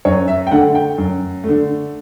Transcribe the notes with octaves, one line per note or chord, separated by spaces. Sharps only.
F#2 C#5
E5
G5
D3 A3 F#5
G5
F#2
A3
D3